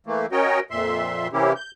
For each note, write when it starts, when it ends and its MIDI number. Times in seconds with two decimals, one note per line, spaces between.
0.06 0.26 52
0.06 0.26 57
0.06 0.26 58
0.32 0.60 61
0.32 0.60 66
0.32 0.60 70
0.32 0.60 73
0.32 0.60 75
0.32 0.60 79
0.71 1.28 41
0.71 1.28 46
0.71 1.28 76
0.71 1.28 84
1.33 1.53 48
1.33 1.53 52
1.33 1.53 58
1.33 1.53 61
1.33 1.53 64
1.33 1.53 67
1.56 1.71 91